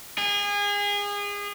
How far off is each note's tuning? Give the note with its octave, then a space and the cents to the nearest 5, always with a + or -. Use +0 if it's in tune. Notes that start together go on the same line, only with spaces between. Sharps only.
G#4 -30